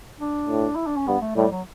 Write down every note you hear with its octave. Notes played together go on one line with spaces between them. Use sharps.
D4
A2
E4
D4
C#4
G2 B3
A3
A2 G3
F#3